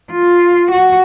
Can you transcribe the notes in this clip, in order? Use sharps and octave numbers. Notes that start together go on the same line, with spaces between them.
F4
F#4